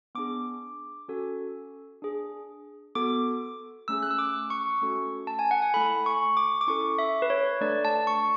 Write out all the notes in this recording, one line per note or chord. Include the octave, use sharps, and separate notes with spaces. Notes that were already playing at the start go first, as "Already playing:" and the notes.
B3 D4 G#4 D6
C#4 F#4 A4
D4 G#4
B3 F#4 A4 D6
A3 C#4 G#4 E6
F#6
E6
D6
C#6
A3 C#4 F#4 A4
A5
G#5
F#5
G#5
A3 E4 A4 B5
C#6
D6
D6
C#4 E4 A4 C#6
E5
B4
C#5
A3 D4 A4 D5
A5
C#6